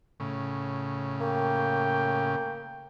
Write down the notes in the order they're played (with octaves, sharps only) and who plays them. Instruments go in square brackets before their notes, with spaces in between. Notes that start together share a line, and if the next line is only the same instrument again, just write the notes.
[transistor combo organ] A2 C#3
[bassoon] A#3 [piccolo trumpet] G5